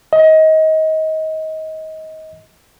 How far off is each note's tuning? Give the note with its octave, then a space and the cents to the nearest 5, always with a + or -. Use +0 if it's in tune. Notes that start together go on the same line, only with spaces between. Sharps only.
D#5 +25